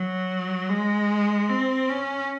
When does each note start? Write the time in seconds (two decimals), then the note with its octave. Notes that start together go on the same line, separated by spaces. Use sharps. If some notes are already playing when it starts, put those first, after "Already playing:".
Already playing: F#3
0.69 G#3
1.49 C4
1.89 C#4